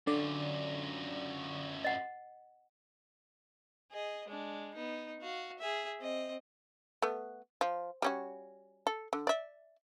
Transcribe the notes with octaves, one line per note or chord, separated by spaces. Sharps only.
F#2 D3 F4 D5
D#5 F#5
G#4 D#5
G#3 D4
B3 D#4
F#4 F5
G#4 E5
C4 D#5
A3 B3
F3
G3 C#4 F#4
A4
D3
D5 E5